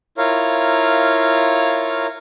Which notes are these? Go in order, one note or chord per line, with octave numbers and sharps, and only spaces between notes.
E4 F4 A#4 C#5 F5